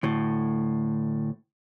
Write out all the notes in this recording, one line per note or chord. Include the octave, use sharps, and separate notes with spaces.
D2 A2